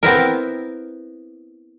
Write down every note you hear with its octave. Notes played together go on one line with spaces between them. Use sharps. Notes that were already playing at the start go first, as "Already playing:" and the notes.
B3 C4 E4 A#4